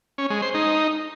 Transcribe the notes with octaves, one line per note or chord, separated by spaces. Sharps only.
C#4
G#3
C5
D#4